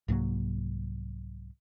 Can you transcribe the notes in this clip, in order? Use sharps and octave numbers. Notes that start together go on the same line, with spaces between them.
C2 G#2 F#3 A#3